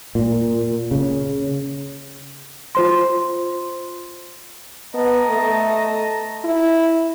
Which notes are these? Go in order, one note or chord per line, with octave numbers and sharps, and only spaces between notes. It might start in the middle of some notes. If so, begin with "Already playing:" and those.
A#2
C#3
F4 C5 C6
B3 D#5 A5 A#5
A3
E4